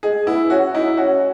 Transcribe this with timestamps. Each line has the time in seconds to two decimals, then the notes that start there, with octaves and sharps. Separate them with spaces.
0.03 G#3 G#4
0.27 B3 E4
0.50 C#4 F#4
0.74 D#4 E4
0.97 C#4 F#4